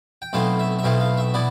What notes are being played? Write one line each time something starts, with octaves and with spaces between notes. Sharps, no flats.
G5
B1 B2 A3 C4 E4 F5
E5
E5
B1 B2 A3 C4 E4 F5
F5
E5
B2 B3 E4 D5